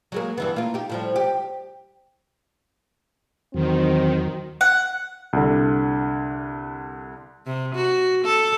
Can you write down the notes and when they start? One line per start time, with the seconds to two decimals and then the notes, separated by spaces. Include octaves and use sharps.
0.12 F#3 G#3 A#3
0.38 G2 E3 B3
0.56 A#3 F4
0.74 D#4 G4
0.89 A2 F3 G3
1.16 G4
3.54 E2 D#3 F#3 C4
4.61 F#5
5.33 C2 D3
7.46 C3
7.75 F#4
8.25 A4